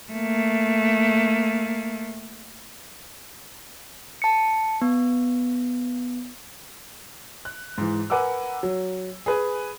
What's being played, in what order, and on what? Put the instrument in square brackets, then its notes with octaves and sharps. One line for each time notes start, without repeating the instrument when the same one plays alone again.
[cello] A3 A#3
[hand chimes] A5 C#7
B3
[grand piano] F#6
G#2 E3
A#4 B4 F#5 G#5 D6 E6
F#3
G#4 B4 G#5